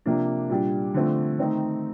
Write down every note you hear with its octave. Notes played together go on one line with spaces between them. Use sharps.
C3 F3 A#3 D4
A#2 G3 D4
D3 F3 A3 C4
D#3 A3 C4 D#4